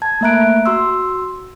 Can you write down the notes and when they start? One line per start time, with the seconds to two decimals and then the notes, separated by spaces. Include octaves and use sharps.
0.02 A5 G#6
0.21 A3 A#3 E5 A#5 F#6 D7
0.66 F#4 C6 E6